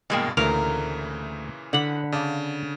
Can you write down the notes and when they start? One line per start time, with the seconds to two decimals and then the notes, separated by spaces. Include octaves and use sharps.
0.10 G2 B2 E3 G#3 A#3 D#5 G5
0.37 D2 A#2 C#3 E3 A3 A#4 F5
1.73 D3 D5 F#5 B5
2.12 C#3 D5 F5 A5